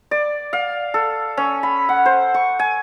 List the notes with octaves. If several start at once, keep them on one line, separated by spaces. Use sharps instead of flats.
D5
F5
A4
C#4
B5
F#5
C5
C#6
G#5